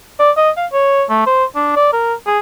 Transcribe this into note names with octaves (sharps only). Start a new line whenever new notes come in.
D5
D#5
F5
C#5
A3
C5
D4
D5
A#4
G#4